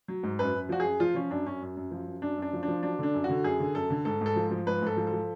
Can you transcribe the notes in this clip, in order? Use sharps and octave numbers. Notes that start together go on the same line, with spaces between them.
F#3
G#2
F#2 B4
F#2
F3 F#4
F#2 G#4
F3 F4
F3 C#4
F#2 D4
F#2 C#4
F#2
F#2
F3
F#2
F#2 D4
F#2
D4
F3
D4
F3
F#3 D4
D3 D4
F#2
F#4
D3
F#2 G#4
D3
F#2 A4
D3
G#2 A4
G#2 A4
F3
F3
G#2 B4
G#2 A4
F3
A4
F3